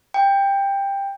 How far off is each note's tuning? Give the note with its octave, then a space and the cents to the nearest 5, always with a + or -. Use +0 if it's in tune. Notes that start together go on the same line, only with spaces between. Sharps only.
G5 +15